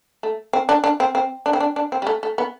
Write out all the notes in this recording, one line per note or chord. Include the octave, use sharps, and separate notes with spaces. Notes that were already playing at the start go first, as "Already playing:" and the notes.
A3
C4
D4
D4
C4
C4
D4
C4
D4
D4
C4
G3
A3
A3
B3